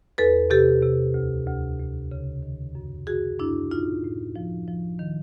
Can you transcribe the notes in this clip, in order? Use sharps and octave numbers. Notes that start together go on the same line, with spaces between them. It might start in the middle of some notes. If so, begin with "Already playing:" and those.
E2 A4 B4
C3 G4 A4
C3
D2
D2
D2
C#3
D#3
F#2
F#2 F#4 G#4
F#2 D4 E4
A2 D#4 F4
A2
F3
F3
D#3